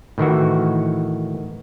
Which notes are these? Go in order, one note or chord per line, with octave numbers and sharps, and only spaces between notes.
A2 D#3 E3 F#4